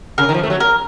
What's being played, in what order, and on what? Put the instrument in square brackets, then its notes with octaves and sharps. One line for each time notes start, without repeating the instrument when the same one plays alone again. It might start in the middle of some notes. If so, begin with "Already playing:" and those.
[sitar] C#3 [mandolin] A#4
[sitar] D#3
F3
A3
F#3
[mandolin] A#4